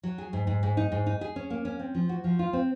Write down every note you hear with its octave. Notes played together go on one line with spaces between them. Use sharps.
F#3
G#4
G#2
G#2
G#2
D#4
G#2
D#4
G#4
C#4
A#3
C#4
C4
F3
F#4
F3
F4
C4